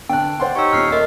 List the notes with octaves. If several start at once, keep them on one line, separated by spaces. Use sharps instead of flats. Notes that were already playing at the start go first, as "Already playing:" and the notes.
D3 B3 G5 A5 F#6
C5 D5 F#5 C6
D#4 G4 C#5 C#6 E6
D#1 A#3 F6 C7
A3 A#4 D#5 C6 D6